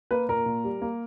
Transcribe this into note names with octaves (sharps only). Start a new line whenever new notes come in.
A#3 B4
A#2 A#4
A#2
G3
A#3